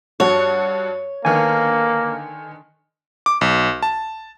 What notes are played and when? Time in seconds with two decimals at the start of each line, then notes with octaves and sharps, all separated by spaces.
0.20 G2 F#4 C#5
1.25 D3 D#3 A#3 B3 G#5
3.26 D6
3.41 B1
3.83 A5